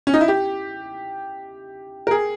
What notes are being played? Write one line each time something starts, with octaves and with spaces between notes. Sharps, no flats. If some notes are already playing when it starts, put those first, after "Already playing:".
C#4
D#4
E4
G4
A#4
G#4